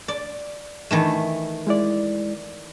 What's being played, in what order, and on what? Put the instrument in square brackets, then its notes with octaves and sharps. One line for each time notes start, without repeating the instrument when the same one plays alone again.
[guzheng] D5
D#3 E3 A3
[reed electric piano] G#3 E4 D5